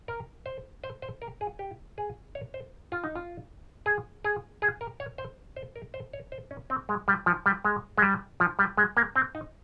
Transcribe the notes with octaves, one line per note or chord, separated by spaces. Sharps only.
A#4
C5
C5
C5
A#4
G#4
G4
G#4
C#5
C5
F4
D#4
F4
G#4
G#4
G#4
A#4
C#5
C5
C5
A#4
C5
C#5
C5
C#4
C4
G#3
G3
F3
G3
G#3
G#3
G3
F3
G3
G#3
A#3
C4
D#4